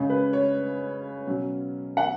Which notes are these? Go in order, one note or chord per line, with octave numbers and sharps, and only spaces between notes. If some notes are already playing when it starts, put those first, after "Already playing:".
Already playing: C#3 G#3 C#4
B4
C#5
B2 F#3 C#4
F#5